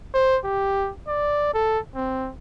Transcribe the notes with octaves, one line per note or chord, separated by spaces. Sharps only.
C5
G4
D5
A4
C4